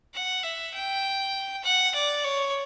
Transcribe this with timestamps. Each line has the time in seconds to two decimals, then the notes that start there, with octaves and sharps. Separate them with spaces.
0.14 F#5
0.44 E5
0.75 G5
1.64 F#5
1.95 D5
2.25 C#5